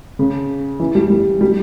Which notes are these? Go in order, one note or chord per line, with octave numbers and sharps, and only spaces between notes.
C#3
E3
G3
G3
G3